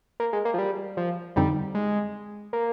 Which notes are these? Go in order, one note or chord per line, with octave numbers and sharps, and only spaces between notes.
A#3
G#3
A#3
F3
G3
F3
F2 D3 F3 G3 C4 D#4
G#3
A#3